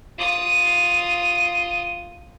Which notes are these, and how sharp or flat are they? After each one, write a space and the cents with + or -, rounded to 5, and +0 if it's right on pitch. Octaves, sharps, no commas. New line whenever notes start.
F4 +0 D#6 +0